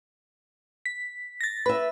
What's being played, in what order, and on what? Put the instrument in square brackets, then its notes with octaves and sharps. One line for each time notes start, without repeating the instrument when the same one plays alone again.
[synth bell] B6
A6 A#6
[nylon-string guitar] B4 E5 [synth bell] B5